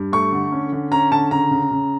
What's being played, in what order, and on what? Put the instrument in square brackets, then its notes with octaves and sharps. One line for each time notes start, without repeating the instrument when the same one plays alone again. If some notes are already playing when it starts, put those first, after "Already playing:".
Already playing: [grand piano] G2
A3 C#6
D3
C#4
D3
C#4 A#5
D3 A5
C#3 A#5
C#3
C#3